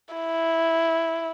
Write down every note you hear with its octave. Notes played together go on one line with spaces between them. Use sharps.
E4